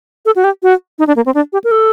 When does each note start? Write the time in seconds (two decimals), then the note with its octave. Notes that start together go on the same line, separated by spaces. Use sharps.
0.26 A4
0.36 F#4
0.44 G4
0.63 F#4
0.99 D#4
1.07 D4
1.16 A#3
1.26 C4
1.34 D4
1.53 G4
1.64 A#4
1.71 A4